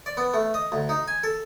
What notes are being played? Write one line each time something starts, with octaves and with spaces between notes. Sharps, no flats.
D5
B3
A3
D#5
D2
D#4
G#5
A4